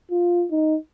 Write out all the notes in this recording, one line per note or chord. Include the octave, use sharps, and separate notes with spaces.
F4
D#4